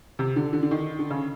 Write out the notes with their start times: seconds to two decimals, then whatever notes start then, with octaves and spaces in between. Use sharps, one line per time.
0.19 C3
0.36 D3
0.53 D3
0.63 D3
0.71 D#3
0.99 D3
1.10 C#3